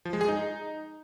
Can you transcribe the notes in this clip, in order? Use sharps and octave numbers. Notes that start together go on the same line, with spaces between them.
F3
G#3
G#4
D#4